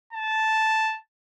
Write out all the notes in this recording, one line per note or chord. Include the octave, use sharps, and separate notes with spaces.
A5